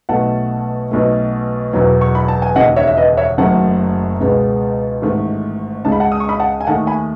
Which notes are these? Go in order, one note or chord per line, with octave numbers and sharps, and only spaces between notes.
B1 B2 A3 F#5 A5
B1 B2 A3
E1 E2 B2 F#3
C#6
B5
A5
G#5
E1 D#2 C#3 D#5 F#5
C#5 E5
E5
B4 D#5
C#5 E5
F#1 F#2 D#3 F#3 A3 F#5 A5
C#2 B2 G#3 B3
A1 G#2 D#3 A3
C#2 C#3 G#3 A5
B5
F#5 A5
D#6
C#6
B5 D#6
F#5 A5
G#5
D#2 D#3 A3 F#5 A5
G#5 B5